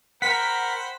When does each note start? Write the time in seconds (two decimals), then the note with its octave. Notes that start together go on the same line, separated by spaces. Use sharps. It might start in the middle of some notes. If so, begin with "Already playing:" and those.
0.22 A#4 C5 F#5 G5 B5 B6